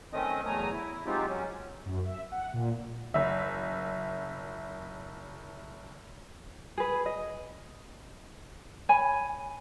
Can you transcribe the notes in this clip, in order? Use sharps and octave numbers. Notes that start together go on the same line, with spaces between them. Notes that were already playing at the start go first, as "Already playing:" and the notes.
D#3 A3 C4 C#4 D#5 D#6
E2 F#3 A3 G#5 A#5 D#6
E4
F#3 G#3 C4 D#4 F4 G4
F#3 C#4
F#2
E5
F#5
A#2
F#1 E5
G#4 B4
D#5
C#5 G#5 B5